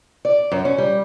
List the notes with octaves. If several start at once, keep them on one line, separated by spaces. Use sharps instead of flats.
D5
F#2
C#4
G3